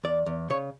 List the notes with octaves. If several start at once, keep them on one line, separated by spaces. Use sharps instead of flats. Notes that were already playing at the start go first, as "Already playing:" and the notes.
E2 D5
E2
C#3 C#5